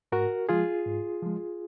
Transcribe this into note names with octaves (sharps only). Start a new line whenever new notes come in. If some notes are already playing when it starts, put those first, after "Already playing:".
G#2 F#4 A#4
F3 G#3 F4 G#4
G#2
F3 G#3